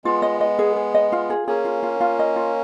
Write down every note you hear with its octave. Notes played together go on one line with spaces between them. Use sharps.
G#3 B3 F4
D#5
D#5
G#4
G#4
D#5
F4
G#4
A#3 C#4 G#4
F4
F4
F4
D#5
F4